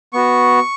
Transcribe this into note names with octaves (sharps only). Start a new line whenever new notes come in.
B3 F#4 C#6